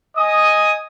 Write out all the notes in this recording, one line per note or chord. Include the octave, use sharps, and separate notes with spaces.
D#5 G#5 D#6